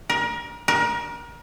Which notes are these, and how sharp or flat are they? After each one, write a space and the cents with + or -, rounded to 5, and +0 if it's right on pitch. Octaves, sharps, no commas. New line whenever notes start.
A#4 +30
A#4 +30